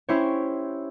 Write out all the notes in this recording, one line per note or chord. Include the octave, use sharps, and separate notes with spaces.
C#4 E4 G4 C5 C#5